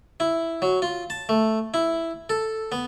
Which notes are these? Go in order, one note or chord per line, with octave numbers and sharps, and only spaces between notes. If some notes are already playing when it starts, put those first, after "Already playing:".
E4
F#3
F4
A5
A3
E4
A4
B3